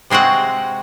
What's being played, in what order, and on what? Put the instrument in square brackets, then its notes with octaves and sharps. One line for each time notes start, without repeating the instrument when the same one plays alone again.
[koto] C3 G#3 C4 F#4 F#5